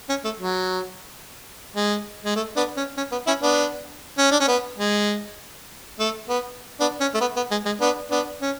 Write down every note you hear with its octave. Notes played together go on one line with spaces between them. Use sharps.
C#4
A3
F#3
G#3
G#3
A3
B3 D4
C#4
C#4
B3
C#4 E4
B3 D4
C#4
D4
C#4
B3
G#3
A3
B3
B3 D4
C#4
A3
B3
B3
G#3
G#3
B3 D4
B3 D4
C#4